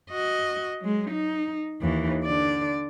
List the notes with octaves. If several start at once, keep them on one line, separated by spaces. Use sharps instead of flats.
F#4 D#5
F#3 G#3
D#4
D#2 E3
D3 D5